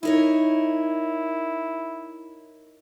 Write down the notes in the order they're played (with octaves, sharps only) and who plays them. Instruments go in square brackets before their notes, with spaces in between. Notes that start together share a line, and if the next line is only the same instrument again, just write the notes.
[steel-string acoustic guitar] D#4 A#4 C#5 [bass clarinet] E4